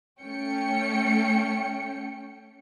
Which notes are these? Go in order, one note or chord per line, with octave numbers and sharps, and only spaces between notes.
A3 C#4 G5 C#7